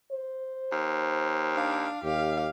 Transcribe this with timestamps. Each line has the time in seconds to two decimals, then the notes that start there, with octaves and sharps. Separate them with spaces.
0.12 C5
0.72 D#2
1.53 D4 F5
2.04 D#2 G4 F5